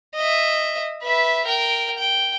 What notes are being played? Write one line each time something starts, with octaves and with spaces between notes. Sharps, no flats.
D#5 E5
B4 E5
A#4 G5
G5